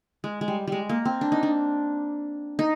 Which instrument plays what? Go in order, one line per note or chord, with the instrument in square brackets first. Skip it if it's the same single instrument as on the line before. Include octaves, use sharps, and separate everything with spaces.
[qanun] G#3
G#3
G3
G3 G#3
A#3
C4
D4
D#4
D4
D#4